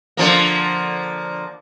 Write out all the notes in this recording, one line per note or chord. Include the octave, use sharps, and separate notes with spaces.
D3 F3 A#3